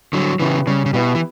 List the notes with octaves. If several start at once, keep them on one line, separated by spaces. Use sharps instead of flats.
D3 F#3 G3
C#3 E3 B3 E4 G4
C#3 G3
C#3
B2 B3 E4 G4
E3